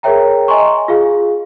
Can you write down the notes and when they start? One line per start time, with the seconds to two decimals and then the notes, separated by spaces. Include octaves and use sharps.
0.03 G#4 A#4 C#5 E5 G5 A#5
0.48 D#5 G#5 A#5 C6 C#6
0.88 F4 G#4 F5